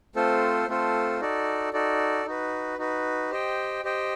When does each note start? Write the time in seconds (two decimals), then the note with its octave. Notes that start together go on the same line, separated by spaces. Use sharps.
0.16 A3 C4 F4 A4 C5
0.67 A3 C4 F4 A4 C5
1.20 D#4 F#4 A4 D5
1.73 D#4 F#4 A4 D5
2.26 D#4 F#4 B4
2.78 D#4 F#4 B4
3.31 G4 C5 D#5 G5
3.83 G4 C5 D#5 G5